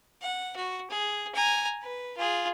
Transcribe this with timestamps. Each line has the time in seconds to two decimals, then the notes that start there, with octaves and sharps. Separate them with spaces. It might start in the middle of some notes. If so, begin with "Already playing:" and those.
0.21 F#5
0.56 F#4
0.90 G#4
1.35 G#5 A#5
1.82 B4
2.17 F4 G#4